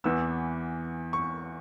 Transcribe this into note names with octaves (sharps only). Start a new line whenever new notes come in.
E2 E3 B3 E6
C#6